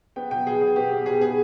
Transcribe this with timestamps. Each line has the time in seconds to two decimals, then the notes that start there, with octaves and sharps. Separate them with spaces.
0.16 B3 G5
0.30 B2 G5
0.46 B2 G#4
0.61 B3 G#4
0.76 B3 G4
0.91 B2 G4
1.06 B2 G#4
1.21 B3 G#4